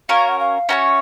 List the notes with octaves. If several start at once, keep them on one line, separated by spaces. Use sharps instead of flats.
C#4 F#4 A#4 C#5 F5
F#5
F5
C#4 F#4 A#4 C#5 E5